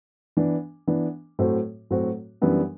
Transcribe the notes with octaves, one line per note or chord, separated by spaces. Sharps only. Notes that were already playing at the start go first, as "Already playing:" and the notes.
E3 B3 D4
E3 B3 D4
A2 F#3 C4 F#4
A2 F#3 C4 F#4
F#2 E3 G3 B3 D4